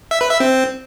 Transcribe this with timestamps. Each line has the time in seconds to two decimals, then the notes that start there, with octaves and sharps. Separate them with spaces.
0.11 E5
0.21 B4
0.31 E5
0.40 C4